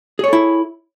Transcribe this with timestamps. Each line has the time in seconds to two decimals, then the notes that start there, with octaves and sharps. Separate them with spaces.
0.19 G#4
0.24 C#5
0.28 A4
0.33 E4